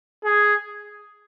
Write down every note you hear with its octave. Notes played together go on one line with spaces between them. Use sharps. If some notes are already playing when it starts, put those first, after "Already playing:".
G#4